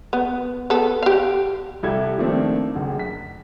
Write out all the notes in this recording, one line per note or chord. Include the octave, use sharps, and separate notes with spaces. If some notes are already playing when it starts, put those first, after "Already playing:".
B3
B3 A4
G4 F5
C2 E4 G4 A4 G#6
D#3 F3 A3 A#3 C4 D4
F#1 D2
B6